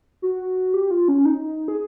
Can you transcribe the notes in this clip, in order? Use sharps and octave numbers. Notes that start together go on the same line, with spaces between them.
F#4
G4
F4
C#4
D#4
G#4